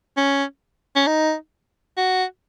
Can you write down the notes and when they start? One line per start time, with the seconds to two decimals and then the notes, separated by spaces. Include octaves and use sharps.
0.17 C#4
0.96 C#4
1.07 D#4
1.97 F#4